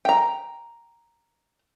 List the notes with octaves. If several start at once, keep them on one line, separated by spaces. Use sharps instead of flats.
G5 A#5